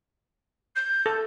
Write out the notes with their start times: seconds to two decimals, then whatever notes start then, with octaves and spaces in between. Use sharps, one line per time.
0.76 G6
1.06 A4